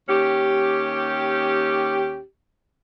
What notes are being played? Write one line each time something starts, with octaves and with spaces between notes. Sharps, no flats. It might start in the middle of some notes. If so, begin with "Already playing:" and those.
D#2 C#4 G4